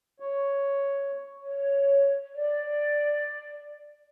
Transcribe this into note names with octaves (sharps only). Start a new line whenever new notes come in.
C#5
C#5
D5